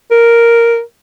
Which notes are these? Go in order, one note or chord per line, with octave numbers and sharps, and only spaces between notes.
A#4